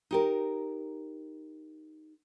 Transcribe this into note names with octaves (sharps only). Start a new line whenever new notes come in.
D#4 G4 A#4